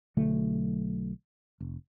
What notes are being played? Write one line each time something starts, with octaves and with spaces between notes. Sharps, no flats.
B1 D3 F#3 A3
F1